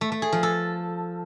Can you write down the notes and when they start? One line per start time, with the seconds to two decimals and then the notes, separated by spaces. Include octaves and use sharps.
0.01 A3
0.12 A3
0.22 G#4
0.32 F3
0.43 A4